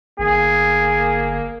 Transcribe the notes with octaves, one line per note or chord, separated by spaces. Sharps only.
G1 A#3 G#4